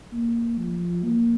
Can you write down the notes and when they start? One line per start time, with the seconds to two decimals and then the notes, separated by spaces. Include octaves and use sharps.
0.12 A#3
0.58 F3
1.03 A#3